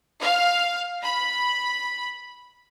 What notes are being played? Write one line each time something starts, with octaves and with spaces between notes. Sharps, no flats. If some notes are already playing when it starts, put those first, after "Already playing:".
F5
B5